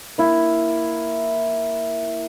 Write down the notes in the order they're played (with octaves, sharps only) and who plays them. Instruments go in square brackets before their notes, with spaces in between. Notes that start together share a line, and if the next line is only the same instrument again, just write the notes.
[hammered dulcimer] A#3 E4